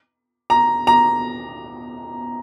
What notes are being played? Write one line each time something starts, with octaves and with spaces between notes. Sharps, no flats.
A#5
A#5